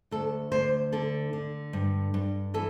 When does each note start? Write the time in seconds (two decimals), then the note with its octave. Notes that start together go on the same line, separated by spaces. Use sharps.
0.11 D2 A4
0.52 D2 C5
0.92 D3 A4
1.33 D3
1.73 G2
2.14 G2
2.54 E3 A4